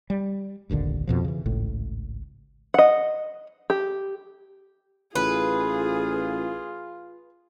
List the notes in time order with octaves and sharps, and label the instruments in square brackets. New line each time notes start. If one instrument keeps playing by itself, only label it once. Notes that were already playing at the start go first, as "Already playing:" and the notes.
[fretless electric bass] G3
F1 A#1 D#2 D3
F2 B2 F3
C#3 E3
G#1 C#2 A2
[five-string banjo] D#5 F#5
G4
[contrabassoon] A1 [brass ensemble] F4 [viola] G#4 [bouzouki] B4